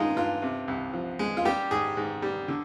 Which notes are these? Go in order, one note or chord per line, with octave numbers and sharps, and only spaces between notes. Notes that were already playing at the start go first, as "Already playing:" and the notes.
Already playing: G2 G#3 D#4 F4
G2 F4
C3
C2
F3
G#3
F4
G3 G4
G#2 G#4
G#2
G3
D3